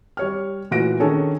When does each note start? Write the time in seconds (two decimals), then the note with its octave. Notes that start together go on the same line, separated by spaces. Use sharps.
0.17 G3 C#5 F6
0.71 A#2 E3 A3 F#4 A#6 D7
1.00 D#3 C#4 D4 G#4 A4 C#5